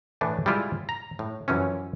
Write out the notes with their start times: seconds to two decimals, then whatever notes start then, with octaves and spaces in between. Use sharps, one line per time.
0.21 A2 E3 A3 D4
0.46 G3 G#3 E4 F4
0.89 A#5
1.19 A2
1.48 F#2 E3 F3 C#4